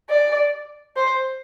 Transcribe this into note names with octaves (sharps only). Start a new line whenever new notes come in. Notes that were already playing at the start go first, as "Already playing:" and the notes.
D5
C5